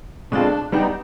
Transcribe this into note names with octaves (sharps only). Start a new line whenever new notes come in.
B2 G#3 C4 D4 F4 A4
G3 B3 D4 D#4 G4